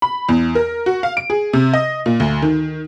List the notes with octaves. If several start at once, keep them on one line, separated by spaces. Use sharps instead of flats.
B5
E2
A#4
F#4
F5
D7
G#4
C3
D#5
A#2
D2
D#3